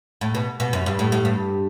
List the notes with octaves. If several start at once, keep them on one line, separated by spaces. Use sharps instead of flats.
A2
B2
B2
F#2
G2
A2
A2
G2